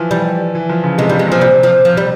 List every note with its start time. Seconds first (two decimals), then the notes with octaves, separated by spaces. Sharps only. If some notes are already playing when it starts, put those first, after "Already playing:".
Already playing: E3 F3
0.11 G3
0.55 E3
0.69 F3
0.83 C#3
0.98 C3 G#3
1.09 C3 G3
1.19 G#3
1.27 A#2 F3
1.41 C3 G3
1.63 F3
1.85 F3
1.97 G3